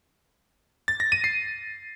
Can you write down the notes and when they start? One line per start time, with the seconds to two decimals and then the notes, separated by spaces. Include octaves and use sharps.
0.88 A6
1.00 A#6
1.12 D#7
1.24 C7